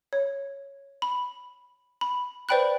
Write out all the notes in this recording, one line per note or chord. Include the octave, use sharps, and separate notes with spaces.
C#5
B5
B5
B4 C5 D5 G5 B5 F#6